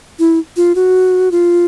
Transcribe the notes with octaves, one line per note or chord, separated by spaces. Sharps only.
E4
F4
F#4
F4